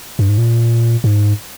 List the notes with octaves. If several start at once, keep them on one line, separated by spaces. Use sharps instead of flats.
G2
G#2
A#2
G#2